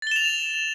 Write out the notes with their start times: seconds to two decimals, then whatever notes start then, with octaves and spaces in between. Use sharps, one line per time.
0.02 A6
0.07 G7
0.11 E7
0.16 F7